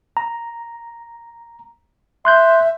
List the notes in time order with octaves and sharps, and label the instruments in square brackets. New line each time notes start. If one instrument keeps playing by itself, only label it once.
[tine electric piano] A#5
[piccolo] E5 [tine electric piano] C6 F#6 G6